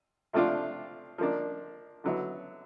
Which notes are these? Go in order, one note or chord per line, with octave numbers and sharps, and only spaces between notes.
C3 F3 A3 D4 F4
F3 A#3 D4
D3 F#3 B3 E4